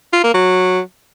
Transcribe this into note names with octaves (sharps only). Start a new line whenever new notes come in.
F4
A#3
F#3